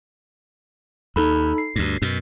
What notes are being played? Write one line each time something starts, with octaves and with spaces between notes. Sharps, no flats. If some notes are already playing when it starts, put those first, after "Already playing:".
D#2 D#4 A4 B5
C7
D2 G2
F#2 B2